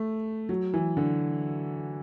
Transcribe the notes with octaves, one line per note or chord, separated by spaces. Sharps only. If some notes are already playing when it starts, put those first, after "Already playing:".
Already playing: A3
F#3
E3
D3